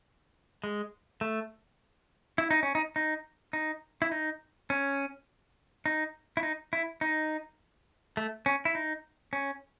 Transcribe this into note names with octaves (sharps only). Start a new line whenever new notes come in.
G#3
A3
E4
D#4
C#4
D#4
D#4
D#4
E4
D#4
C#4
D#4
E4
D#4
E4
D#4
A3
C#4
E4
D#4
C#4